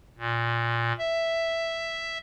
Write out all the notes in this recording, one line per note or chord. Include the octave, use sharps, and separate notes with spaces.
A#2
E5